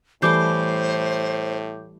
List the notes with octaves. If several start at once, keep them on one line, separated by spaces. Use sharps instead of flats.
A2 E3 G3 A3 C5 D6 G6 C7